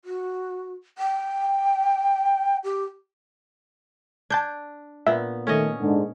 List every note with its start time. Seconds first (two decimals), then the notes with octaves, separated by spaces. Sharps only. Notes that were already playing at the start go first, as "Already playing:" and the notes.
0.05 F#4
0.98 G5
2.64 G4
4.30 D4 A5 G6 G#6
5.07 A#2 B3 E5
5.47 D#3 A3 C#4 C#5 D#5
5.80 G#2 D3